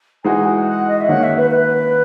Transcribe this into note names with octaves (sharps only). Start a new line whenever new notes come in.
E3 G#3 D#4 F#4 G#5
F#5
F#5
D#5
E5
D#3 A#3 C#4 F#4 F#5
E5
B4
B4